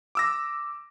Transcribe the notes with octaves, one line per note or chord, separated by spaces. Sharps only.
D6 E6 A#6